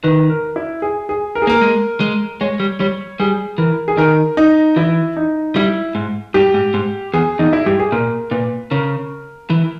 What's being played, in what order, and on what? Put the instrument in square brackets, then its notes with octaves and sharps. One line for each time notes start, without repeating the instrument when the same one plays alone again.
[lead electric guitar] D#3 [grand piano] B4
[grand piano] A#4
E4
G#4
G#4
A#4
G#4
[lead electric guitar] A#3 [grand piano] A#4
[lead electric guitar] G#3
G#3
[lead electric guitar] G#3 [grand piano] C#5
[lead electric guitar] G3
[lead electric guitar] G3 [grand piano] C#5
[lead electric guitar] G3 [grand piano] G#4
[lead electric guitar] E3 [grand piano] A#4
[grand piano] G#4
[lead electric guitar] D#3 [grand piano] A#4
[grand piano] D#4
[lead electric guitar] E3 [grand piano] E4
[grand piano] D#4
[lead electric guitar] G3 [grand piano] E4
[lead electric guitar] G#2
[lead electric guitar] G2 [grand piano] G4
[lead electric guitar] G#2
G#2
[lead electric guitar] E2 [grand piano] G#4
[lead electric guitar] E2 [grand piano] D#4
[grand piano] E4
[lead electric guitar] G2 [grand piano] G4
[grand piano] G#4
[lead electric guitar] A#2 [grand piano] A#4
[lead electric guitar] A#2 [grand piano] B4
[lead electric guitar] C#3 [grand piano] A#4
[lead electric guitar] E3